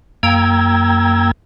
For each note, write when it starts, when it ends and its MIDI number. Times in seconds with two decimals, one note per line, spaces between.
0.23 1.31 42
0.23 1.31 58
0.23 1.31 79
0.23 1.31 82
0.23 1.31 88
0.23 1.31 92